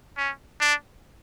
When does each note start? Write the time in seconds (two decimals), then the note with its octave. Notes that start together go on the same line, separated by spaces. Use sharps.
0.17 C#4
0.61 D4